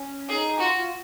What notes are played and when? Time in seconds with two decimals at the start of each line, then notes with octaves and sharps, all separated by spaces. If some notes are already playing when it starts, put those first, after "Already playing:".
Already playing: C#4
0.29 D#4 G#4
0.59 F4 F#4
0.75 F4